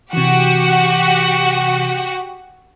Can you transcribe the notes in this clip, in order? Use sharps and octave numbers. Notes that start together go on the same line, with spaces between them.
C3 E3 F#4 G4 F#5